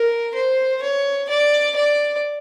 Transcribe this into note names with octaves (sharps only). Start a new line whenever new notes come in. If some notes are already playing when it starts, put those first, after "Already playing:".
Already playing: A#4
C5
C#5
D5
D5